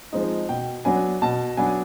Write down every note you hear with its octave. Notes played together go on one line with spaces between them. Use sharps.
F3 G#3 C4 D#4
B2 G5
F#3 B3 D4 G#5
B2 A5
F#3 B3 D4 G#5